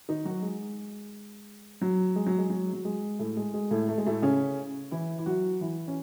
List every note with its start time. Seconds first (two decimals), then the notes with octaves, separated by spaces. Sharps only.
0.09 D#3 D#4
0.25 F#3 F#4
0.42 G#3
1.81 F#3
2.16 G#3
2.26 F#3
2.38 G#3
2.50 F#3
2.73 F#3
2.85 G#3
3.19 A2 A3
3.37 G#3
3.54 G#3
3.71 A2 A3
3.88 A3
3.98 G#3
4.06 A2 A3
4.22 C#3 C#4
4.91 E3 E4
5.18 E4
5.26 F#3 F#4
5.61 E3 E4
5.87 C#4